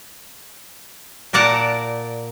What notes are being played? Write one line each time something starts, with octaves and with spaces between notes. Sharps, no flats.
A#2 A#4 D5 F#5 A5 A#5